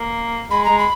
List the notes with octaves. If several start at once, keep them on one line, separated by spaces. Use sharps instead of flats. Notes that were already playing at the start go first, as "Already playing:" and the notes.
Already playing: A#3
G#3 B5
G#3 A#5
B5